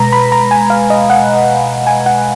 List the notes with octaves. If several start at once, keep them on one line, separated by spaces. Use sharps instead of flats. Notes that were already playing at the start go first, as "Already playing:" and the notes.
Already playing: B2 G#3 B4 A#5
B5
A#5
G#5
F5
D#5
F#5
G#5
F#5